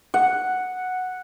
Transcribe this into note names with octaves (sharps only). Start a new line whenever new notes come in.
F#5